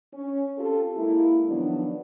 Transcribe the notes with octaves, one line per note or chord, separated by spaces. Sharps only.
C#4
C4 F4 G4 A4
G#3 A#3 E4
D#3 F3 F#3 B3 D4